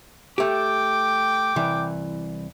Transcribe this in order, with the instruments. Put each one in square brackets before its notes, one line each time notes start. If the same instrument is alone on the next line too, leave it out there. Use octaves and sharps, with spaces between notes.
[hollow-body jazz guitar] A3 G4 [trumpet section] G5 D6
[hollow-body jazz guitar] C2 E3